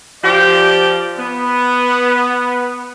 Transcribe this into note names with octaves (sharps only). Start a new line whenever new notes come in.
F3 G4 D5
B3